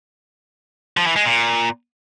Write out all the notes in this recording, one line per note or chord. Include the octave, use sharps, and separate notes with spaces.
F3
E3
G#3
A#2